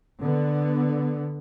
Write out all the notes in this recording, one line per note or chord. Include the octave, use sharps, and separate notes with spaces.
D3 B3